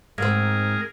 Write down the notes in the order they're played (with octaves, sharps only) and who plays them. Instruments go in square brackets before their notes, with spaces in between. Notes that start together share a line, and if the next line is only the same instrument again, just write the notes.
[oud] G#2 C4 [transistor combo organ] G#4 A#4